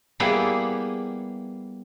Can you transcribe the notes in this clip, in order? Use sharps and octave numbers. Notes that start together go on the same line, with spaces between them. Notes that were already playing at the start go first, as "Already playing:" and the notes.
G3 A#3 B3 E4 G4 G#4